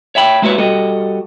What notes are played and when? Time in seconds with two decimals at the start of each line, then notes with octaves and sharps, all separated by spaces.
0.15 C#5 E5 G5 B5
0.42 G#3 A#3 E4 F#4 B4 C#5
0.58 G3 F#4 A4 D#5